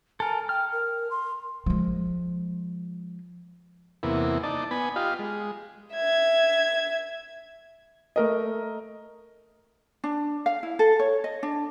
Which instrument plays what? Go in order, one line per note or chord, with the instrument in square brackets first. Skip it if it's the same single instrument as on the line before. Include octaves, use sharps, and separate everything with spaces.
[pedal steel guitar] A4 A#4 [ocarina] G#5
[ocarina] G5 [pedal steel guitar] F6
[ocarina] A#4
C6
[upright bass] F3 G#3
[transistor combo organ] E2 C3 A#3 B3 E4
D#4 D5 A5
B3 G#5 B5
F4 G4 D#5 F5
G#3
[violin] E5 G#6
[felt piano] A3 A#4 D#5
[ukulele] D4
F5
E4
A4
C#5
D#5
D4